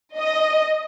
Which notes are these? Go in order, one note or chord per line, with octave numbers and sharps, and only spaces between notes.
D#5